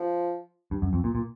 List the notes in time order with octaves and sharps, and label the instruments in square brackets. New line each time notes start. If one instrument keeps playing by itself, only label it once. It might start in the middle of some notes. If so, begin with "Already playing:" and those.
Already playing: [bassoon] F3
[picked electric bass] G2
F#2
F2
A#2
A#2